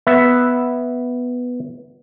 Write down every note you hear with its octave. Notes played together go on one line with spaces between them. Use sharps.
B3 E5